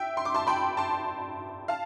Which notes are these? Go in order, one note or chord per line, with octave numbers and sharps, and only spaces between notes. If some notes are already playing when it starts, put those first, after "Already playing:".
Already playing: E5 G5
C6
D6
A5 C6
G5 B5
A5 C6
F5 A5